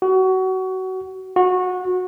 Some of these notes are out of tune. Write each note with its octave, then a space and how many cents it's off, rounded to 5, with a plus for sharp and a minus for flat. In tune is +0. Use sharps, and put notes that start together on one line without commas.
F#4 +25
F#4 -20